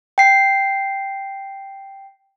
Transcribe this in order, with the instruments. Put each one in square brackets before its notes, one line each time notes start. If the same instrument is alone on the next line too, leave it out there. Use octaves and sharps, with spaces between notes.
[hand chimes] G5 C7